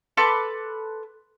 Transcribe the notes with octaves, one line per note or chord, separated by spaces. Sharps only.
A4 B4 C6 D6